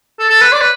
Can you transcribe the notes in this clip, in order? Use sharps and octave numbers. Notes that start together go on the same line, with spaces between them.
A4
A4
B4
D5
B4